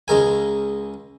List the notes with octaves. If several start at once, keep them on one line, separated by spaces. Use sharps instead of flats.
C#2 G#3 A#4 G#5